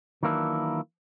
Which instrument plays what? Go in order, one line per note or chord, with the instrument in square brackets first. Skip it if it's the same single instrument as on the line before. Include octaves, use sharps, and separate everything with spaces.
[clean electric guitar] D#3 E3 F#3 A#3 D4 E4